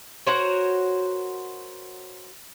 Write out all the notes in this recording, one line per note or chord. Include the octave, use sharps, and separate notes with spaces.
F#4 A#4 C5 C#5